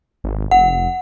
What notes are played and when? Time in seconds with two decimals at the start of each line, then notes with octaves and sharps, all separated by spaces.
0.24 G#1
0.51 F1 F#5